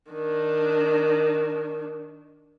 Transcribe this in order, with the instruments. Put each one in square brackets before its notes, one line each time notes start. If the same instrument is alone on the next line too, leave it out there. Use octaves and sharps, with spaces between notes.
[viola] D#3 D4